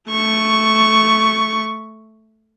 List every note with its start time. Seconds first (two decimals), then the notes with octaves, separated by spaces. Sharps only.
0.10 A3 C#6